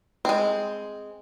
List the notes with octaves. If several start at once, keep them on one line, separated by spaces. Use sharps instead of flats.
G#3 C4